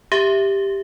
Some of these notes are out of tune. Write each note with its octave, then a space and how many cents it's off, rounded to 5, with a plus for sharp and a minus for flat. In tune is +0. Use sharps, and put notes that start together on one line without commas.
G4 +5 E5 +0